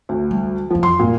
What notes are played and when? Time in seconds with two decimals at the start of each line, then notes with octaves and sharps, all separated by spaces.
0.09 D2
0.31 G3
0.70 F2 E3 F3
0.83 C6
0.99 G2 A#2